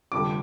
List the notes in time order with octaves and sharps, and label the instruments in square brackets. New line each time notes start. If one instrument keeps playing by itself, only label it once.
[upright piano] F1 F2 D3 G3 D6